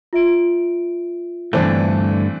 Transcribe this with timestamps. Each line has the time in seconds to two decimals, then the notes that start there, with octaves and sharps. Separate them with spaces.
0.13 F4 E5 D7
1.53 G2 D3 E3 A3 C4 D4